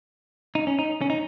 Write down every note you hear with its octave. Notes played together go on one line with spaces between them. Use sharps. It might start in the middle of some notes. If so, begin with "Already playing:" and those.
D#4
C#4
D#4
C#4
D#4